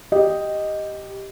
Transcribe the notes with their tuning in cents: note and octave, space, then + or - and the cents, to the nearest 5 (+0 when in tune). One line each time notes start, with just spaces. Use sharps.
G4 +0 D#5 +0